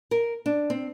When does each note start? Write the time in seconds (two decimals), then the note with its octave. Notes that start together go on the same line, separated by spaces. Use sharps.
0.11 A#4
0.46 D4
0.70 C4